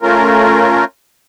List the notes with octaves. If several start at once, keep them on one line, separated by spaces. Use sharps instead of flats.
A3 C#4 F4 A#4